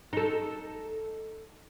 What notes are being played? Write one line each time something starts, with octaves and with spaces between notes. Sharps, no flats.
D#4 A4